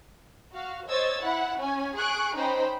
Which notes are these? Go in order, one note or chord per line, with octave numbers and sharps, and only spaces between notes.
F#4 F5
C5 C#5 D#5 E6 G#6 A6
E4 F#5
C#4 G#5
G#4 C#6 F#6 D7
C#4 D#4 C5 G5 B5